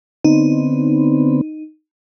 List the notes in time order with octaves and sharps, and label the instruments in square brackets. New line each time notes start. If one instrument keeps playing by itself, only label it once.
[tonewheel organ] D3 B3 C4 [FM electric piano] D#4